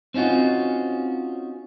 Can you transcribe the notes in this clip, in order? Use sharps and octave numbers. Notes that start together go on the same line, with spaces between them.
C4 C#4 D#4 F4 F#4